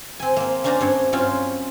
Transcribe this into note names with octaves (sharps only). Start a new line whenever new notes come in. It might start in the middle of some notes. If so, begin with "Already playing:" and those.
C4 G#5
A#3 C4
A#3 C#4 D4 C5 D5 A#5
G2 C4 C#5
F#3 C4 C#4 F4 C5 F5